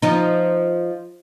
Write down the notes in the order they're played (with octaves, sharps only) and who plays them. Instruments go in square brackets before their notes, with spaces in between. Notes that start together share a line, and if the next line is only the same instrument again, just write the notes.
[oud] F3 D#4